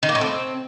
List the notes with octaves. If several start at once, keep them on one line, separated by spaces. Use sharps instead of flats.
D#3
A#3
A2
C4